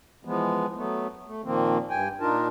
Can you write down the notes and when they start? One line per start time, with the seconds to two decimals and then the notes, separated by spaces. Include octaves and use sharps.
0.25 E3 F3 G#3 B3
0.76 F#3 A3 B3
1.27 A3
1.44 A#2 D#3 F3 A#3 C4
1.90 G2 G5 G#5
2.21 A#2 D4 D#4 F4 A#4 A5